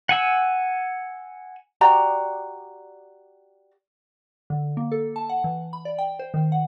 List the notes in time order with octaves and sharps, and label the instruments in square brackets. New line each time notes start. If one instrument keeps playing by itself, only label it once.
[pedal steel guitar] F#5 G#5 E6
[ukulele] F#4 G4 D5 A#5
[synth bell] D3
A#3
A4
A5
F#5
E3
B5
D5
G5
C5
D#3
F#5